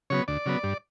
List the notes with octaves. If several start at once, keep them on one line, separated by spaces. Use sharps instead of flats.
C#3 F#3 B3 C#5
D2 D5
C#3 F#3 B3
G2